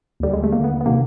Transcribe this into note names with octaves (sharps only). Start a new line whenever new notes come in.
D#2 D3 G3
G#3
A3
D#2 D3 A#3
B3
B3
C3 D#3 A#3